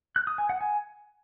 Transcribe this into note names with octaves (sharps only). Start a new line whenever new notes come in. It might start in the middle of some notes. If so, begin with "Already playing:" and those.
F#6
D#6
G#5
F#5
G#5